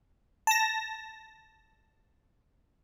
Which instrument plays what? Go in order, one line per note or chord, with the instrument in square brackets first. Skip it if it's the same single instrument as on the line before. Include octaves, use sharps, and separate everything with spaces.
[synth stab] A5 A#6